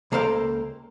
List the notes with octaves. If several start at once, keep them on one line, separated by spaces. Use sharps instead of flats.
C#2 A#3 A4 C5 F5 G5